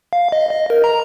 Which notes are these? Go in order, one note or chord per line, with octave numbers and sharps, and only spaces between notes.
F5
D#5
D#5
A#4
A#5